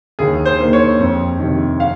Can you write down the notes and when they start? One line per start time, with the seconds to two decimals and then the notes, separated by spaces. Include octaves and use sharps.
0.19 D#2 G#4
0.46 C5
0.60 D#3 A#3
0.73 C#5
0.99 F2
1.39 C3 D#3
1.80 F5